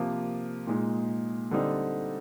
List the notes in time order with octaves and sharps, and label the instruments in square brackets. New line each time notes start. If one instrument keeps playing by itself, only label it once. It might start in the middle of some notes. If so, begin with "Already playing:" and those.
Already playing: [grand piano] C3 F3 A#3 F4
A#2 G#3 D#4
D3 G3 C4 D#4